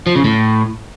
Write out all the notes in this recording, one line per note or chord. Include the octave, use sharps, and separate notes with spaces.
F3
C#3
A2